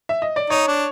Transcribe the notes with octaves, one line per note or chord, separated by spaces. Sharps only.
E5
D#5
D5
D#4 C#5
D4